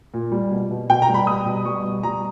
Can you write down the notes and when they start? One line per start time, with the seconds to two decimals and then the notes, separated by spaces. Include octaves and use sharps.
0.14 A#2
0.32 G3
0.51 B2
0.71 B2
0.89 B2 G5
1.02 A#5
1.09 G3
1.14 B5
1.27 G3 D#6
1.46 B2
1.65 G3 C#6
1.84 B2
2.03 G3 A#5